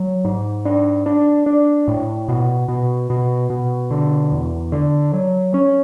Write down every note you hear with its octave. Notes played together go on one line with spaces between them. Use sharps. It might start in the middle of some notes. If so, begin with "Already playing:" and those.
Already playing: F#3
G#2
D4
D4
D4
A2
B2
B2
B2
B2
D3
E2
D3
F#3
C#4